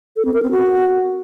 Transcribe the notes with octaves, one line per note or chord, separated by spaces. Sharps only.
A4
C4
A#4
C4
F#4